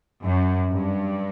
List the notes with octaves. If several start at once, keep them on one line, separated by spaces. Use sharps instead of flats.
F#2
G2